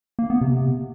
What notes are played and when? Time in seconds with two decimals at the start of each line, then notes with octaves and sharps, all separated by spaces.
0.19 A#3
0.30 B3
0.41 C3